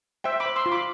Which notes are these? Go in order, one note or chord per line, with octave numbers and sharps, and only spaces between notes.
C5 E5 G5
B5 D6
C5
C6 E6
F4
B5 D6